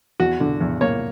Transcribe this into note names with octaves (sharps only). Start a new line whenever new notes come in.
E2 F#4
D3
E2
A#3 C#5